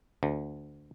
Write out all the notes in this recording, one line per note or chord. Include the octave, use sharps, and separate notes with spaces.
D2